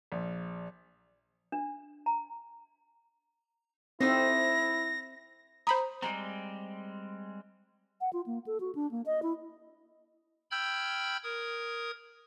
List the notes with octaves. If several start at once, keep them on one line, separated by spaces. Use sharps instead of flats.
A#1
D4
A#5
A3 C4 D#4 E4 C5 A#6
C5 A#5 B5 D#6
G3 G#3 C4 A#5
F#5
F4
A#3
A4
F#4
D4
A#3
D#5
E4
G5 B5 E6 F6 G6 G#6
A#4 D#6 G#6